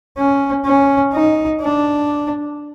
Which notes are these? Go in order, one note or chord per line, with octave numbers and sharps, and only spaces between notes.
C#4
C#4
D#4
D4